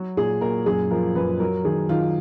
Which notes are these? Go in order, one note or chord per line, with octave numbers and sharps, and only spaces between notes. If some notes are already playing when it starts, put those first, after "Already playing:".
Already playing: F#3 F#4
A#2 G#4
A#2 A#4
F#2 G#4
F3 A#4
F#2 B4
F#3 A#4
D#3 G#4
D#3 F4